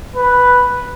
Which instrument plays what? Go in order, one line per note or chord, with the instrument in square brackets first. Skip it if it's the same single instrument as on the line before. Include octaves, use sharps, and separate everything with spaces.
[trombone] B4